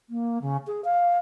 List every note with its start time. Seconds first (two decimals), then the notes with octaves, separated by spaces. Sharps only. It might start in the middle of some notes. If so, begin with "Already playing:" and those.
0.09 A#3
0.41 C#3
0.66 G#4
0.84 F5